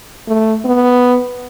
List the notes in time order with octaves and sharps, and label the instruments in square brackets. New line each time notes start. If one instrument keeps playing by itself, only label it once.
[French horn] A3
B3